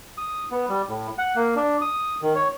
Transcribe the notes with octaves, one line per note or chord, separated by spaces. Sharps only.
D#6
B3
G3
A2
F#5
A#3
D4
D#6
D#3
C#5